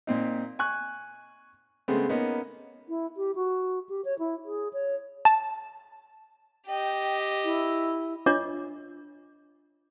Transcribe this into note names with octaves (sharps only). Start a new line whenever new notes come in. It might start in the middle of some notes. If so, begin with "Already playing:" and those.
A#2 C4 D#4
G#5 C#6 F#6
C#3 G#3 A3 B3 C4
A#3 B3 C#4 D#4
E4
G4
F#4
G4
C#5
E4
G#4
C#5
A5
G4 D#5 G5
E4
D4 F4 C#5 D#5 D6